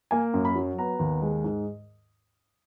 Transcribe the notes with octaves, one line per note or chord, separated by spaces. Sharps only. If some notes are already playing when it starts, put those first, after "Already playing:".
A#3 G#5
F#2
B5
F#3
B3 A#5
D#2
G#3
G#2